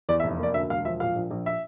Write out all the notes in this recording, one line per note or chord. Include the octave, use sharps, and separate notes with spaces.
E2 D5
E5
F1
A#3 D5
D2 E5
E1 F5
F3 E5
A#2 F5
A#1
A#1
E5